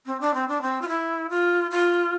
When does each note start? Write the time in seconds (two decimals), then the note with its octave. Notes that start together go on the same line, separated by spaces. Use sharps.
0.06 C4
0.21 D4
0.34 C4
0.48 D4
0.62 C4
0.81 F4
0.88 E4
1.30 F4
1.71 F4